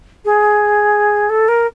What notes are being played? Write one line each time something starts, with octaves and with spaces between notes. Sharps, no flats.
G#4
A4
A#4